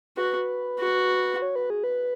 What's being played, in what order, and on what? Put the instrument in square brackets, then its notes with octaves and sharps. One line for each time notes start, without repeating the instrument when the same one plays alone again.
[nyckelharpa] F#4 [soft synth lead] B4
[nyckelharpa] F#4
[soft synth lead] C#5
B4
G#4
B4